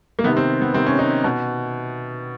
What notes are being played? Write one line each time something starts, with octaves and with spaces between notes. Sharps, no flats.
A#3
C3 D#3 B3
C4
B3
C3 D#3 C4
C#4
D#4
B2